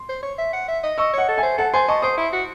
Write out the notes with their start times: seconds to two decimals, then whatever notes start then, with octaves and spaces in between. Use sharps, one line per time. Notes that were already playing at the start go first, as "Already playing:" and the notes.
Already playing: C6
0.09 C5
0.23 C#5
0.38 E5
0.53 F#5
0.68 E5
0.83 D#5
0.98 D#5 C#6 E6
1.13 C#5 D#5 F#5
1.29 A4
1.38 C5 E5 G#5
1.58 A4 F#5 A5
1.73 C5 G#5 C6
1.88 D#5 A5 C#6
2.02 C5 C6 D#6
2.17 E4
2.33 F#4